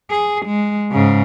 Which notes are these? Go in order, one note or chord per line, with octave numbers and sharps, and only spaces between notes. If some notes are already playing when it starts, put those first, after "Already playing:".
G#4
G#3
G#2 C#3